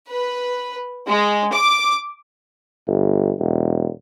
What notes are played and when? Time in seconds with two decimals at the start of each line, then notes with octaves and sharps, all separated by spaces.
0.11 B4
1.07 G#3
1.52 D6
2.87 G1
3.39 E1